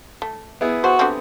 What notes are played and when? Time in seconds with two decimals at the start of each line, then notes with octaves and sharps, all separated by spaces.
0.22 A3
0.61 B3 E4 G#4
0.84 F#4 C5
0.99 D3 G3 C4